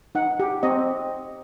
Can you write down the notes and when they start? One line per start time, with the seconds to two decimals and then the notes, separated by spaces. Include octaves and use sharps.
0.15 D#4 F#5
0.40 G4
0.63 C4 D#5